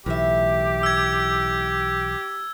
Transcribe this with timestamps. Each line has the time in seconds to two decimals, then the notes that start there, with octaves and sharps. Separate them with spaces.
0.06 B1 A2 E3 G4 E5
0.83 E6 G#6